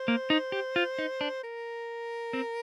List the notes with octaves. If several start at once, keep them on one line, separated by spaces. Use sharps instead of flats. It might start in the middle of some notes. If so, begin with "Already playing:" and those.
Already playing: C5
A#3
D#4
G4
F4
D#4
D4
A#4
C4